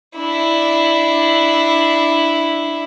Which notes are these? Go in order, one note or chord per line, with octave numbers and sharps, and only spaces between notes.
D4 E4